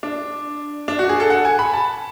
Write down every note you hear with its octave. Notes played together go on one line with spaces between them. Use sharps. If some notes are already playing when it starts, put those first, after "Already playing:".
D4
D4
F#4
G#4
A4
F#5
G#5
B5
A5